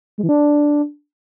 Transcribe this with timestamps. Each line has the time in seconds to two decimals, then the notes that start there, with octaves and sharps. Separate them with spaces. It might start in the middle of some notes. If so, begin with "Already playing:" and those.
0.18 G#3
0.23 E3
0.29 D4